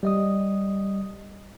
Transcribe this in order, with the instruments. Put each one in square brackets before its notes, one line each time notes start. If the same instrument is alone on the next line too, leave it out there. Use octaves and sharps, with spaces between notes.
[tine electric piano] G3 D#5 D#6